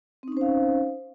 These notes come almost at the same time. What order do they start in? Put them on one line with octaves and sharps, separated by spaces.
C4 D#4 C#4 C5 F5